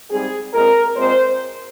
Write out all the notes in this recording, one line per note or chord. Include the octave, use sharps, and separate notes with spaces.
G#2 G3 C4 G#4
A#2 G#3 C4 A#4
A#2 G#3 C4 C5